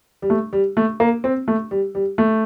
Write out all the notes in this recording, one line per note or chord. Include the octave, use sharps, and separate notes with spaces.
G3
A3
G3
A3
A#3
C4
A3
G3
G3
A3